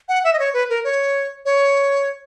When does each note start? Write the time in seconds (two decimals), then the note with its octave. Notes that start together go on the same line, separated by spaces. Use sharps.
0.09 F#5
0.24 E5
0.33 D#5
0.39 C#5
0.54 B4
0.70 A#4
0.84 C#5
1.45 C#5